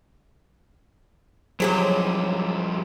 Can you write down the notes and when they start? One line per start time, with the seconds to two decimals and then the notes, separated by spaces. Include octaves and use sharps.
1.60 G2 F3 F#3 G4 G#4 C5